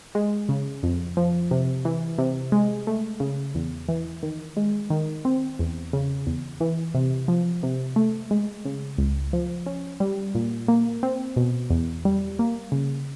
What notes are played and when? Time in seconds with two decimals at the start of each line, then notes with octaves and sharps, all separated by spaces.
0.15 G#3
0.49 C#3
0.83 F2
1.17 F3
1.51 C3
1.85 E3
2.18 C3
2.52 G#3
2.87 A3
3.20 C#3
3.55 E2
3.89 E3
4.23 D#3
4.57 G#3
4.90 D#3
5.25 C4
5.59 E2
5.93 C#3
6.27 E2
6.60 E3
6.94 C3
7.28 F3
7.63 C3
7.96 A3
8.31 G#3
8.65 C#3
8.98 C#2
9.33 F3
9.66 C#4
10.00 G3
10.35 A#2
10.68 A#3
11.03 C4
11.36 B2
11.70 E2
12.05 G3
12.39 A#3
12.72 C#3